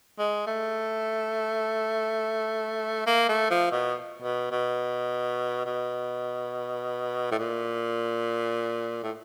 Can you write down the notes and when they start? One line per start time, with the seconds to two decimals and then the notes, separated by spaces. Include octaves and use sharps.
0.19 G#3
0.47 A3
3.06 A#3
3.29 A3
3.50 F3
3.72 B2
4.22 B2
4.51 B2
5.66 B2
7.31 A2
7.39 A#2
9.03 A2